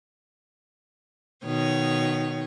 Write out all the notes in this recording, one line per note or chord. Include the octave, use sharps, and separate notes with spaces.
B2 D#3 C#5